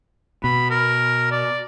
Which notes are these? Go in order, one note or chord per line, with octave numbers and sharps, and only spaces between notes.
B2 B5
A#4
D5